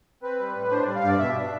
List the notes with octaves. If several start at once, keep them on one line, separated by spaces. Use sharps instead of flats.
C4 B4
G3
A2
D4 C5
G3 D5
F5
G2 D5
B2 E5
D4